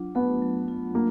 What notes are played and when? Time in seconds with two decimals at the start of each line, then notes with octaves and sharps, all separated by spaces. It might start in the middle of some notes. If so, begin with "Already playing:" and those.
Already playing: F#3 D4 F4
0.15 A3 B3
0.42 F#3
0.68 F4
0.95 A#3 D4